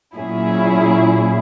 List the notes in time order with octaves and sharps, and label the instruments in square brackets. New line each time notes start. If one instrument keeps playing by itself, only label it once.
[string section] A#2 F#3 C#4 E4 G#4